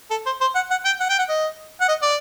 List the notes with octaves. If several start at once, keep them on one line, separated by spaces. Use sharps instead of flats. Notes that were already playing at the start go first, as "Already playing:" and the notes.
A4
C5
C5
F#5
F#5
G5
F#5
G5
F#5
D#5
F#5
D#5
D5